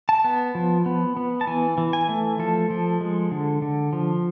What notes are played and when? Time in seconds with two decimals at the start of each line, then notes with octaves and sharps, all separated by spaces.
0.09 A5
0.24 B3
0.55 F3
0.86 B3
1.17 B3
1.41 A5
1.47 E3 G#5
1.78 E3
1.93 G#5
2.09 A3
2.39 F3 A4
2.70 F3
3.01 G#3
3.31 D3
3.62 D3
3.93 F3